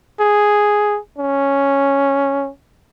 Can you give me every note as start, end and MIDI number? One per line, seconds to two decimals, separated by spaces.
0.20 0.99 68
1.18 2.50 61